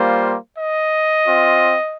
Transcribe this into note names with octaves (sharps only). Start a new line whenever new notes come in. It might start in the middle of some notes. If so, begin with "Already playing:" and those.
Already playing: G3 A#3 F4 C5
D#5
C4 F4